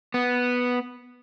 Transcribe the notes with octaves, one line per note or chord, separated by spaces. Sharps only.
B3